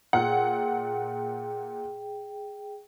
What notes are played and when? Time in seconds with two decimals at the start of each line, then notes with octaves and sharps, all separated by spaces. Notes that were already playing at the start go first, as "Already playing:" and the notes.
0.13 A#2 G#4 F#5 G5